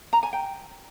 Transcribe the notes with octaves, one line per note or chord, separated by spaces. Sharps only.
A#5
G#5
G5